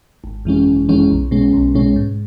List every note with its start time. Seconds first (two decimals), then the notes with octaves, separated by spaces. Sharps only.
0.24 G#1
0.45 F#2 E3 G#3 C#4
0.67 G#1
0.89 F#2 E3 G#3 C#4
1.10 B1
1.31 B2 G#3 C#4
1.53 B1
1.75 B2 G#3 C#4
1.96 G#2